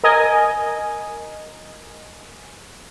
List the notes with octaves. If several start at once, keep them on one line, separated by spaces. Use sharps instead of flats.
A#4 D#5 G#5